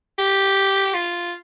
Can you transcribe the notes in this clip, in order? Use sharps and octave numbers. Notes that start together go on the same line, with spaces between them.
G4
F4